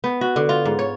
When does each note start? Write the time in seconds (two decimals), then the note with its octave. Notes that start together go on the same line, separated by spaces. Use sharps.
0.04 B3
0.21 F#4
0.36 D3
0.49 F4
0.66 G#2
0.79 C#5